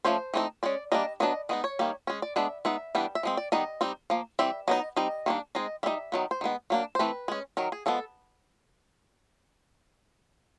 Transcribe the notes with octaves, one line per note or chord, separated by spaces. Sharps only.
F3 A3 C#4 C5
E3 A3 C4 D#4
G#3 C#4 D5
G3 A#3 D4 D#5
F#3 B3 D4 D#5
G#3 B3 D#4 D#5
C#5
D#3 G3 A#3
G#3 C#4
D5
G#3 B3 D4 E5
G#3 B3 D#4 E5
E3 G3 B3 D4
E5
F3 G#3 C4
D5
D#3 G3 B3 D#4 D#5
G3 C4 D#4
F3 A#3
E3 G3 C4 E5
F#3 B3 D#4 D#5
G3 C4 D#4 D#5
D#3 G3 A#3 D4
G#3 C4 D#4 D#5
G3 C4 D#4 E5
D#3 F#3 B3
C5
D#3 G#3 B3
F#3 A#3 D4
C5
E3 A3 C4 B4
G#3 C#4
D#3 F#3 A#4
G#4
F3 G#3 B3 A4